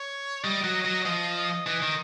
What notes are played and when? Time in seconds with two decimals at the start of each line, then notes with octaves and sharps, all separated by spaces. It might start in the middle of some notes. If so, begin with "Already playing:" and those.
Already playing: C#5
0.44 G3 D#5
0.64 F#3
0.85 F#3
1.05 F3 D#5
1.36 D#5
1.66 E3 D#5
1.82 D#3